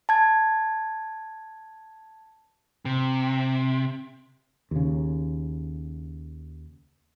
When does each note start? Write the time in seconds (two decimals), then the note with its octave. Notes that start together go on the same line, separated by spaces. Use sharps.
0.09 A5 G#6
2.85 C3
4.71 D#2 C#3